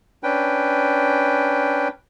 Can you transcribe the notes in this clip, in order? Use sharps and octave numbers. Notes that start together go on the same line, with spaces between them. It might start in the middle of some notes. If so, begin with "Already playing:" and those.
C#4 D4 B4 G5